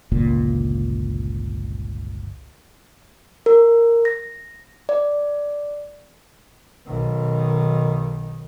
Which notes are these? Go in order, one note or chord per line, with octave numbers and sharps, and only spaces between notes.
G1 C#2 A#2
A#4
A#6
D5
B1 D#3